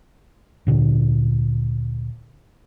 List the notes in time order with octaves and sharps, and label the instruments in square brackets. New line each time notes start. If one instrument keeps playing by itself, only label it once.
[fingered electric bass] D2 A#2 D3